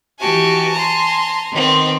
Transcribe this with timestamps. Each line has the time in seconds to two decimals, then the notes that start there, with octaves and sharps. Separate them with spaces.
0.19 E3 F#4 G4 G#5 A5
0.73 A#5 C6
1.52 D#3 B3 C4